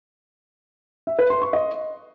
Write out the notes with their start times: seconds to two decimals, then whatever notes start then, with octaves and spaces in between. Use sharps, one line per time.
1.07 E5
1.19 B4
1.30 C6
1.42 C#6
1.53 D#5